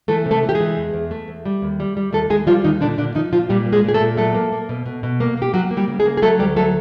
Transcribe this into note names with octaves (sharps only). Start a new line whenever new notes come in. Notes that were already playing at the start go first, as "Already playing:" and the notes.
E3 A3 A4
C3
A3 A4
E3
G4
G#3 G#4
E3
E2
E2
A3
E2
G3
D#2
G3
G3
D#2 A3 A4
D#2 G#3 G#4
F3 G3 F4
D#2 D#3 D#4
A#2 D3 D4
A#2 D3 D4
D#3 F3 D#4
A#2 F3 F4
A#2 G3 G4
A#3
G#3 G#4
A#2 G#4
A3 A4
A#2
F#3 A3 A4
A#3
A#3
B2
B2
B2
A#3
A#3 G4
F#3 A#3 F#4
A#3
G3 G4
C#3
G#3 G#4
A#3
G#4
F#3 A3 A4
D2 G3 G4
F#3 A3 A4